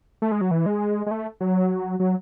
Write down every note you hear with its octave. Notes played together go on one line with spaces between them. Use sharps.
A3
G#3
F#3
E3
G#3
G#3
A3
F#3
F#3